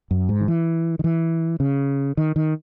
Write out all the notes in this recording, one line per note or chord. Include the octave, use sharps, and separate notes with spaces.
F#2
G#2
D#3
E3
D#3
E3
C#3
D#3
D#3